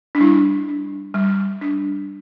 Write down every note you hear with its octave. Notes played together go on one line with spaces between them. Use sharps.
D4
G3 E4
D4
G3
D4